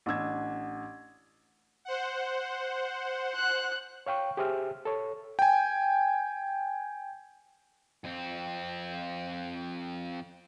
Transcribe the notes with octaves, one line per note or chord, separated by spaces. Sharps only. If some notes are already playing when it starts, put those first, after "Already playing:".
A1 D4 E6 G#6
C5 F#5
F#6
C#5 F5 G5 C#6
G4 G#4 C5 E5 F6
A4 C#5
G5 G#5
F2 C4